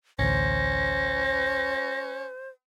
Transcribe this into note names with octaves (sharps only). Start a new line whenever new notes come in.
A1 D2 C#4 C5 A#6